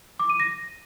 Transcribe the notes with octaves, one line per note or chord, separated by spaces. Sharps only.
D6
D#7
A#6